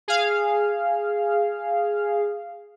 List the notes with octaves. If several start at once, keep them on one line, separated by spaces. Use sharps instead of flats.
G#4 F5